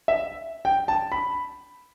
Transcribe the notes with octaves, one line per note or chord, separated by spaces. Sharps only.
E5
G5
A5
B5